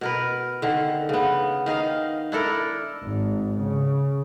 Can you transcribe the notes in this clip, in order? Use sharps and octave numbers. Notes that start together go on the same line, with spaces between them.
B2 A#4 B4
D3 D#3
C#3 B3
D#3 D#4 D#5 F5
D4 E4 A4 A#4
G#1
C#3